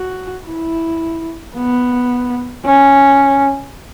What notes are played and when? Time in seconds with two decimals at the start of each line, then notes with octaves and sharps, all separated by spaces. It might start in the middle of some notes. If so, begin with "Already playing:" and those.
Already playing: F#4
0.46 E4
1.55 B3
2.65 C#4